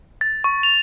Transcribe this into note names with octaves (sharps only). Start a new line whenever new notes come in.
A6
C#6
F7